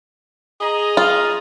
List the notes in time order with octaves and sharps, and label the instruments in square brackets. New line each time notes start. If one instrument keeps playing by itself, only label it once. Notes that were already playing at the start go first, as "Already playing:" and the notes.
[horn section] G#4 D#5 A#5
[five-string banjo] F4